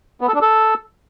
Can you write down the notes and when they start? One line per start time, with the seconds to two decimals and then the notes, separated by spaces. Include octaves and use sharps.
0.21 B3
0.28 A4
0.35 D4
0.42 A4